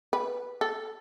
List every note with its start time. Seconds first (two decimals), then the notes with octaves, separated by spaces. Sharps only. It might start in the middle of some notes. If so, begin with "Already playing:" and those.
0.13 B4
0.61 A4